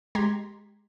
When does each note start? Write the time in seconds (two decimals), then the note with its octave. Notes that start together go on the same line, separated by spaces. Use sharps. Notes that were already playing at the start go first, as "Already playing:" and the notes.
0.15 G#3 G4 A#5 C6 G#6 B6